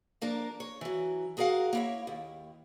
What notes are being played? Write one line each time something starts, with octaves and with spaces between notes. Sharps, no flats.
F3 A#3 D4 A#4
C#5
E3 F#3
F#4 G#4 A#4 D5 F5 F#5
A#3 E4 C#5
D#2